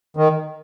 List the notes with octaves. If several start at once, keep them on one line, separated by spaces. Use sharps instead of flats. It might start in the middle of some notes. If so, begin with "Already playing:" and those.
D#3